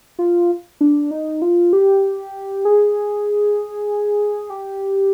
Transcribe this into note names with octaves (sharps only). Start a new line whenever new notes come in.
F4
D4
D#4
F4
G4
G#4
G4